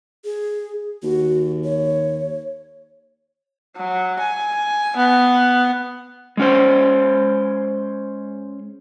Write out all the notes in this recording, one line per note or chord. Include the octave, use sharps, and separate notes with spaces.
G#4
D#2 F#4
C#5
F#3
G#5
B3
G#3 C#4 C5